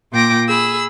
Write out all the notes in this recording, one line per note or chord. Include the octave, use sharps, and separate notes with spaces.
A#2 F4 G5 D6 A#6
G#4 B5 E6